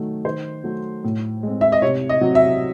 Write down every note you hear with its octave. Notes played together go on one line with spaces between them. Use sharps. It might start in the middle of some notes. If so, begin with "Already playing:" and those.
Already playing: D#3 F#3 A3
D#3 C5
F#3 A3
A2
G#3 C4
E5
D#5
C3 C#5
D#5
F#3 C4
E5